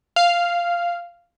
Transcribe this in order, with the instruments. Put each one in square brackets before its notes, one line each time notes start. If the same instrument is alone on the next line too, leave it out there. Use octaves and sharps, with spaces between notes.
[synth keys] F5